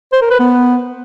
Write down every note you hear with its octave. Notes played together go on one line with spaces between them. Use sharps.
C5
A#4
B4
B3